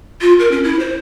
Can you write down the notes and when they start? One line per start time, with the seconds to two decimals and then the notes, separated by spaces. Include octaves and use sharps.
0.21 F4
0.39 A#4
0.51 C#4
0.64 E4
0.79 C5